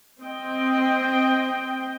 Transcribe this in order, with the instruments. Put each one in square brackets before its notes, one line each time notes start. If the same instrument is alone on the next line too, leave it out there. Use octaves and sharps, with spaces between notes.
[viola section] C4 D#5 G5